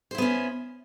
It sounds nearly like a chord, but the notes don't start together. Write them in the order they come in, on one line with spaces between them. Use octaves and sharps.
C5 E4 B3 C#4